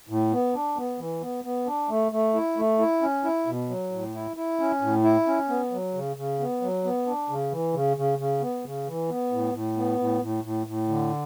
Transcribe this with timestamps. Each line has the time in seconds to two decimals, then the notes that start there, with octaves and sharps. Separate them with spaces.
0.09 A2
0.32 B3
0.55 D4
0.77 B3
0.99 E3
1.22 B3
1.44 B3
1.67 D4
1.89 A3
2.12 A3
2.34 E4
2.57 A3
2.79 E4
3.02 C#4
3.24 E4
3.46 B2
3.69 F#3
3.92 A2
4.14 E4
4.37 E4
4.60 C#4
4.81 A2
5.04 E4
5.27 C#4
5.49 B3
5.71 F#3
5.94 C#3
6.16 C#3
6.40 B3
6.61 F#3
6.84 B3
7.06 D4
7.29 C#3
7.52 E3
7.74 C#3
7.97 C#3
8.19 C#3
8.41 B3
8.64 C#3
8.87 E3
9.09 B3
9.32 A2
9.54 A2
9.77 B3
9.99 A2
10.22 A2
10.44 A2
10.67 A2
10.89 D3